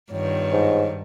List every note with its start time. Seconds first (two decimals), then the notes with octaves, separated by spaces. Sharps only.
0.11 G2 D#3 B3 F4 C#5
0.52 G#2